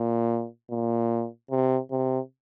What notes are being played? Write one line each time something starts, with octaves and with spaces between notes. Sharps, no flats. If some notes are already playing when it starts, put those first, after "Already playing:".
Already playing: A#2
A#2
C3
C3